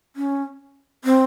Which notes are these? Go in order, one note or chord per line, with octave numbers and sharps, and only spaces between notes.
C#4
C4